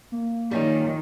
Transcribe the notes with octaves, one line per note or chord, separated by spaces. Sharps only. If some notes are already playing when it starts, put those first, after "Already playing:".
A#3
D#3 G3 C#4 F4